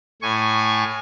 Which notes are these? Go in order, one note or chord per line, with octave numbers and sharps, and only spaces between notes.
A2 G#5 C#6